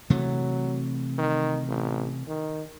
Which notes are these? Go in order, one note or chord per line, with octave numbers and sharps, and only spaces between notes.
C3 E3 F#3 A3
D#3
A1
D#3